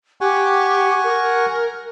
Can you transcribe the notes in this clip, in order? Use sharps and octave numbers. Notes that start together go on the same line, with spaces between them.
G4 F#5 G#5 C#6
A#4